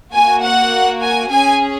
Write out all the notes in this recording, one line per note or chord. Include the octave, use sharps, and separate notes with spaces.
A#3 F#4 G#5
F#5
G#5
C#4 G#4 G#5